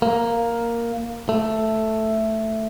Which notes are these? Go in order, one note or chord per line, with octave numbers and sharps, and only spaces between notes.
A#3
A3